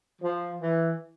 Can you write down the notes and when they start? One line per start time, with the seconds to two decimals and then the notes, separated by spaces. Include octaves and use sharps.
0.22 F3
0.61 E3